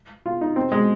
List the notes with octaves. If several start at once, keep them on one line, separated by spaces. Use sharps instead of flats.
F4
D#4
C4
G#3